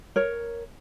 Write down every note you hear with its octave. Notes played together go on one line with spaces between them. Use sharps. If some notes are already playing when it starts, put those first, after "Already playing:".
A#4 C#5